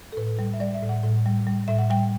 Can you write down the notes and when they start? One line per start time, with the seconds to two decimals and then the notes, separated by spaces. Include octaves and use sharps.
0.12 A4
0.17 A2 B4
0.39 G3
0.53 E5
0.60 G3 D5
0.74 E5
0.82 A2
0.89 F#5
1.03 A2
1.26 G3
1.47 G3
1.68 A2 E5
1.79 F#5
1.90 G3 G5